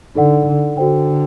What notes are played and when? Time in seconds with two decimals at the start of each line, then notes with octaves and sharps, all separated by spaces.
0.15 D3 D#4 A4 D5 F#5
0.47 D3
0.77 D3 F#4 A4 C5 G5